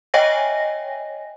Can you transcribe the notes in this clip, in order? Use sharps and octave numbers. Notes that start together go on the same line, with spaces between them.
C#5 D#5 E5 G5 G#5 A#6